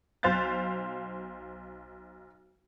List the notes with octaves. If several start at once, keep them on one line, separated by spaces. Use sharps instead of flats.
B1 C5 F5 F#6 A6